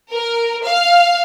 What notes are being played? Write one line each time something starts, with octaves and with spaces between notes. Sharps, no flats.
A#4
F5